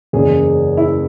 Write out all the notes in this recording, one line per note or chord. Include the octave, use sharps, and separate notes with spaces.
F#1 E2 C#3 G#4
E4